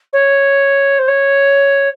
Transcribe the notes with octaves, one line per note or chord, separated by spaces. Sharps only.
C#5
C5
C#5